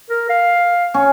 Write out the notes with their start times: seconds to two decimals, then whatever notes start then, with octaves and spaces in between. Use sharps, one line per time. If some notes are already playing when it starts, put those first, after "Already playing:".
0.10 A#4
0.30 F5
0.94 C#4